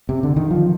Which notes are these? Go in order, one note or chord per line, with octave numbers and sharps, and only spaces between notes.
C3
D3
D#3
F3